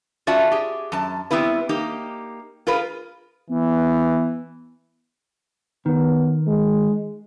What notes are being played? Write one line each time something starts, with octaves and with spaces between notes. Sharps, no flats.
C#4 F4 F#4 D5 E5 A5
G4 G#4
F#2 A5
G3 G#3 B3 C4 E4 B4
A#3 D#4 G4
F4 G#4 A#4 B4
E3 B3
D#3 B3
G#3